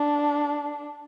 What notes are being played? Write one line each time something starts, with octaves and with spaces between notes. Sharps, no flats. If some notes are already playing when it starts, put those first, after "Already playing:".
Already playing: D4